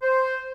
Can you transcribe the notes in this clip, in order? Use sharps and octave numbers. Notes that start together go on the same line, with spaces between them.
C5